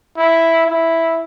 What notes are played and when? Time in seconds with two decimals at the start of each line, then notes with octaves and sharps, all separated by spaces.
0.17 E4
0.67 E4